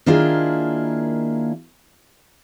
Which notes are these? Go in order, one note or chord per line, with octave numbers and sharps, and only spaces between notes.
D#3 A#3 D4 E4 F4 G#4